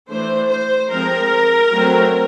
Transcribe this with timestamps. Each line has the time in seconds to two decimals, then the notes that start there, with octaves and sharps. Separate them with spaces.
0.10 E3 A3 D4 C5
0.50 C5
0.91 F3 G#3 C4 A#4
1.72 F#3 A3 C4